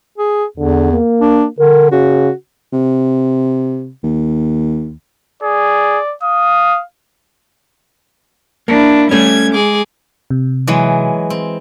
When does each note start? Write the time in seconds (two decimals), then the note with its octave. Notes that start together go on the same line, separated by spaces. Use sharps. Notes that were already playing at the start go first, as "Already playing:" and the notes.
0.18 G#4
0.58 E2 D3
0.92 A#3
1.21 D4
1.59 D3 A#4
1.91 C#3 F#4
2.73 C3
4.03 D#2
5.43 G#4 D5
6.23 F5 D#6
8.68 A#3 D4 E4
9.11 G3 A3 C#4 G#6
9.54 G#3 G#4 D6
10.30 C3
10.67 E3 F#3 G#3
11.30 C4